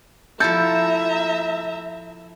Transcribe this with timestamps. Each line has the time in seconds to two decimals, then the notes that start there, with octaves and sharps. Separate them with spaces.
0.40 F3 E4 A4 E5 A#5 G6